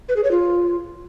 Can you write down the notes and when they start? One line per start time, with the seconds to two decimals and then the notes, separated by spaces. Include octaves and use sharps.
0.09 B4
0.16 G#4
0.24 C#5
0.31 F4